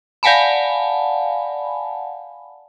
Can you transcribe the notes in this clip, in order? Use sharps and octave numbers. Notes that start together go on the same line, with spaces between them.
D5 F5 F#5 G#5 A5 B5